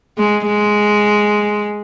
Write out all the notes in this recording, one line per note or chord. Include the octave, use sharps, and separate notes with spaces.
G#3
G#3